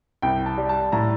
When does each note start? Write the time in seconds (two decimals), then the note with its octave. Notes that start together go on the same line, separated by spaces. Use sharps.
0.22 C2 G5
0.46 A5
0.57 G3
0.69 A5
0.92 A2 A#5